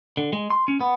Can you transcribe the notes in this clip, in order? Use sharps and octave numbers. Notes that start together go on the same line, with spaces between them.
D3
G#3
C6
C#4
B3